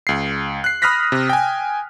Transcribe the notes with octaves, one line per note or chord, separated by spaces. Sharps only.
C#2 C7
F#6 C7
B5 D#6 F6 F#6 A#6 B6
C3
G5 G#5